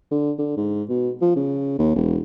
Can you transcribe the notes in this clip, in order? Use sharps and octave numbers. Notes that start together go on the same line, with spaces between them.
D3
D3
G#2
B2
F3
C#3
D#2
E1